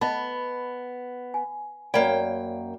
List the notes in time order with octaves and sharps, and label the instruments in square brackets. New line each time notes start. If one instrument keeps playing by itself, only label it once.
[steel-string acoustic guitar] B3 [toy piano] D#5 A5 B5
[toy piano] G#5
[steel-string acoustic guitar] F#2 A#3 G5 [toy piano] D5 F5 B5